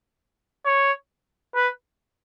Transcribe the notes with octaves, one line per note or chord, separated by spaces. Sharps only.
C#5
B4